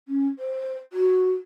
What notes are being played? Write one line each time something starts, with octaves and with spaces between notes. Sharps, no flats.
C#4
C5
F#4